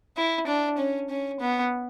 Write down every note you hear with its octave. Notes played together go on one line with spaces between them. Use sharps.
E4
D4
C#4
C#4
B3